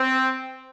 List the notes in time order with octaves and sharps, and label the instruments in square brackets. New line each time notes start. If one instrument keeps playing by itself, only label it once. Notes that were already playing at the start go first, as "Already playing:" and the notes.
Already playing: [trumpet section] C4